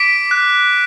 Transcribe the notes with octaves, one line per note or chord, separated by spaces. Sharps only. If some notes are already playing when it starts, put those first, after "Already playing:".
Already playing: D6 B6 D7
F#6